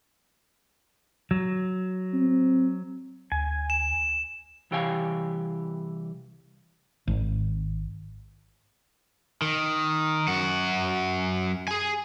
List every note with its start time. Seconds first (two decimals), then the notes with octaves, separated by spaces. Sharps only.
1.31 F#3
2.13 C4
3.32 D2 G#5
3.70 E7
4.71 C2 E3 G4 C#5 F5 G#5
7.08 G#1
9.42 D#3
10.28 F#2 F#4
11.68 G#4 G#5